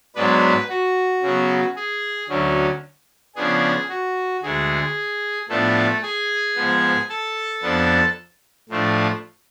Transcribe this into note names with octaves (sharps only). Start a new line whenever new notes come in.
G#2 F#3 B3 D4 B4
F#4
C#3 F#3 B3
G#4
D2 D3 F#3 C#4
C#3 F3 B3 D4 G#4
F#4
D2 D3 G#3 G#4
A2 F3 A3 B3 D4 A4
G#4 G#5
G#2 F3 B3
A4 A5
F2 F3 B3 D4
A2 F3 A3 D4